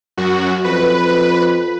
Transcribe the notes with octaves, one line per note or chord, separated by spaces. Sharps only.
F#2 F#4
F2 B4